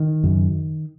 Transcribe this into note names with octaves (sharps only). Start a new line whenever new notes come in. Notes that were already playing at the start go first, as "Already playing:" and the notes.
Already playing: D#3
F#2 C#3